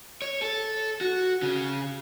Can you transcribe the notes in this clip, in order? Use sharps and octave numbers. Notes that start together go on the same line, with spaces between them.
C#5
A4
F#4
C#3